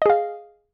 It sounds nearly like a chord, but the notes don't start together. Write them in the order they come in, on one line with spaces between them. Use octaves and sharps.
D#5 G#4 F5